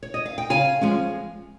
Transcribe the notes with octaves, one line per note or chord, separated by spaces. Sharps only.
C#5
D#5
F5
G5
C#3 F5 G#5
F3 G#3 C#4